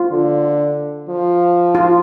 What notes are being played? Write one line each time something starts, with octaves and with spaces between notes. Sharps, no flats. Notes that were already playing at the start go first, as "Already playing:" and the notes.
Already playing: F4
D3
F3
F4